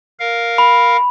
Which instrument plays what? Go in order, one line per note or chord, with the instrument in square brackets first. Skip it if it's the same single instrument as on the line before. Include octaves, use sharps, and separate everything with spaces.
[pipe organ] A#4 F5
[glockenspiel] B5